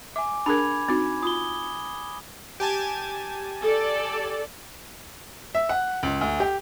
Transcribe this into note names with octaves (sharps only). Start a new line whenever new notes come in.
E5 G#5 D6
D4 G#4 A#4 B5 G#6
C4 D#4 F#4
F4 D#6 G7
G4 G#5 A5
A4 D5
E5
F#5
C#2
D2
G4